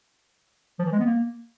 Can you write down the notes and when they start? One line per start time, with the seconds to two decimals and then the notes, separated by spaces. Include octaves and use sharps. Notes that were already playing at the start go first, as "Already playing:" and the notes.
0.79 F3
0.86 E3
0.92 G#3
0.99 B3
1.06 A#3